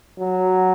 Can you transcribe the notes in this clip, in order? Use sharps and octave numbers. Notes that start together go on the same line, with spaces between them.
F#3